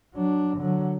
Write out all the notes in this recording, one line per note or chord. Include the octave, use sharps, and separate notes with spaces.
F#3 D4
D3 F#3